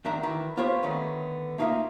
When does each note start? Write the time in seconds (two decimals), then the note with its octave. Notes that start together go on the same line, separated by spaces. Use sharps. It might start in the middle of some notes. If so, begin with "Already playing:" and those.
0.05 D2 D#3 D4 E5 A#5
0.23 D#3 E3
0.57 B3 F4 G4 C5 C#5
0.83 D3 D#3 A3 B3 C#4
1.58 A3 A#3 D#4 F4 E5 F5